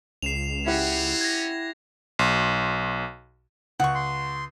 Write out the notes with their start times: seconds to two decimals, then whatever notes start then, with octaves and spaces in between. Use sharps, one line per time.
0.22 C#2 C7 E7 F7
0.66 C4 C#4 E4 G4 F#5
1.21 G#6 A#6
2.19 B1
3.80 C#2 F#5 C#6
3.95 C6